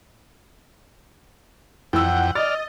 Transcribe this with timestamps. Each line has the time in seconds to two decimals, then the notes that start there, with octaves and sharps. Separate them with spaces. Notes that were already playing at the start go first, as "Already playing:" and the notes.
1.93 F2 E3 F#5 G5 E6
2.35 D5 D#5 F6 A6